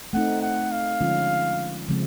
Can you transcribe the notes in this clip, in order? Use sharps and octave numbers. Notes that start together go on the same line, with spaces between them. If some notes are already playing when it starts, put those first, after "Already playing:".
A3 C4 D#4 F#5
F#5
F5
D3 F3 G#3 C#4 F4
C#3 F3 G#3 C4